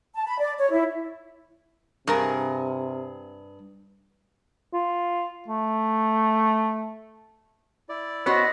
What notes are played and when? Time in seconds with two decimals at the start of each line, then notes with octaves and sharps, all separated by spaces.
0.15 A5
0.26 B5
0.39 D5
0.58 C#5
0.71 E4
2.07 G2 C3 G#4 A#4 D#6
4.73 F4
5.48 A3
7.89 E4 D5
8.26 B3 F#4 C5 C#5 D#5